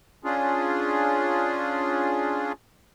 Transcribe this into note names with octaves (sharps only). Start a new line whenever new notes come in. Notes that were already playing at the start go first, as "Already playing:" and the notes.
C#4 D4 F4 G#4